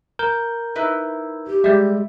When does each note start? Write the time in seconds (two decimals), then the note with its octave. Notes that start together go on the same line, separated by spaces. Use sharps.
0.19 A#4 G6
0.75 D#4 E4 B4
1.47 G4
1.64 G3 G#3 E5